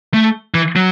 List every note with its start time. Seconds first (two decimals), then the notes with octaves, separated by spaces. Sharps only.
0.14 A3
0.54 E3
0.76 F#3